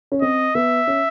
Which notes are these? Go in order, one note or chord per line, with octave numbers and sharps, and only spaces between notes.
C#4
C4 D#5
B3 E5
C#4